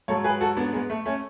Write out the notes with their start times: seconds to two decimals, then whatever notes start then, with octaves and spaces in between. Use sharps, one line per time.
0.08 G#2 F#3 A4 C#5
0.24 G#4 B4
0.41 F#4 A4
0.57 B3 D4
0.73 G#3 B3
0.90 A3
1.05 A3 C#4